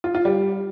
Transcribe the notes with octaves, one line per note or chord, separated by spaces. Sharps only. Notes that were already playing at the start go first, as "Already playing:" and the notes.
F4
F4
G3